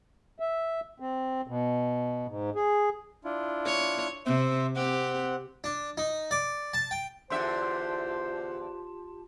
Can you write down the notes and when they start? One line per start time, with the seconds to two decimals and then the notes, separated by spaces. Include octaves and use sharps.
0.40 E5
1.00 C4
1.48 B2
2.27 G#2
2.55 G#4
3.24 D4 E4 F4
3.66 C#5
4.26 C3 C5 E5
4.76 C4 G4 F#5
5.64 D4
5.98 D#4
6.31 D5
6.74 A5
6.91 G5
7.30 E2 D3 F4 G4 C5 E5 A5 C6